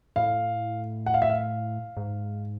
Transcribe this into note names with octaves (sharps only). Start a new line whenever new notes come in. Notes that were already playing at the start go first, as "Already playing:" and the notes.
A2 F5
F#5
F5
E5
F5
G#2